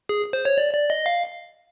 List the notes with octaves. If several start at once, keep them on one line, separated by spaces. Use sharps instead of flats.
G#4
C5
C#5
D5
D5
D#5
F5